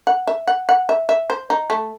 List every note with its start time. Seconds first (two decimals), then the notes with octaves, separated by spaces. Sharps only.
0.07 F#5
0.27 E5
0.47 F#5
0.69 F#5
0.89 E5
1.09 E5
1.30 C5
1.50 D#4
1.70 A3